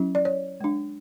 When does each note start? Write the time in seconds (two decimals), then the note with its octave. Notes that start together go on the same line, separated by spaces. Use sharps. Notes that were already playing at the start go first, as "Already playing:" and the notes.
Already playing: F#3 C#4 E4
0.15 D5
0.25 C#5
0.60 G#3 D4